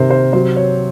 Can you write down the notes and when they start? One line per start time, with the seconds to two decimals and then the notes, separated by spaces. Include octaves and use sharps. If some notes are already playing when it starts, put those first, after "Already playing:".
Already playing: C3 D#3 A#4 C5
0.11 C5
0.33 F#3 C5
0.56 C#5